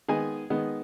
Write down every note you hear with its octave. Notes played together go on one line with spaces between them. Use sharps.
D#3 G#3 B3 G#4 G#5
D#3 G#3 B3